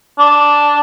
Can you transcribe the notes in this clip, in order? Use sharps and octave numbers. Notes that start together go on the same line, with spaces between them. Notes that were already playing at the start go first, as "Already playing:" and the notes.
D4